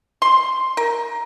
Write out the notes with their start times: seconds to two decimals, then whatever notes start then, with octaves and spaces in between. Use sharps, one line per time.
0.22 C6
0.77 A#4